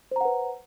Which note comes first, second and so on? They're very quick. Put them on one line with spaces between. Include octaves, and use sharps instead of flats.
C5 A#5 F#5 B4